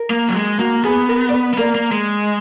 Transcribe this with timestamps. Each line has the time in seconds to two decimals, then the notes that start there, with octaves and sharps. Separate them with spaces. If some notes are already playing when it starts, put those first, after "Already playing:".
Already playing: A#4
0.10 A#3
0.29 F#3
0.35 G#3
0.59 A#3 F#4
0.84 B3 G#4
1.09 A#4
1.29 D5
1.34 B4
1.54 B3
1.58 A#3 A#4 D5
1.75 A#3
1.92 G#3